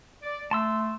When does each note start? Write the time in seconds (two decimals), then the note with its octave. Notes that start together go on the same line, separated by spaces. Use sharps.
0.22 D5
0.51 A3 A5 C6 E6